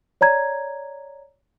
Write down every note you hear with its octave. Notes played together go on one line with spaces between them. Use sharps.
C#5 D5 A#5 G#6